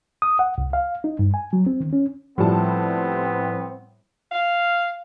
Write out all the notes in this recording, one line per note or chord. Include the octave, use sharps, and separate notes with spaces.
D#6
F#5
C2
F5
D#4
G2
G#5
F#3
C4
D#3
C#4
A2 F3 G3 B3 C4 A5
F5